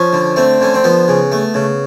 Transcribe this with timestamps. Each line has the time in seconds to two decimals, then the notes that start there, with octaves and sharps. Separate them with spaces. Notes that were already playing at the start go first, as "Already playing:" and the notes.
Already playing: F3 C#4
0.13 D3
0.36 A3 C4
0.60 D3 C#4
0.74 C4
0.84 F3 B3
1.08 C#3
1.32 A3
1.54 C#3